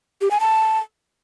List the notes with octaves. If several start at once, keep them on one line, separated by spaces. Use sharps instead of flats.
G4
G#5
A5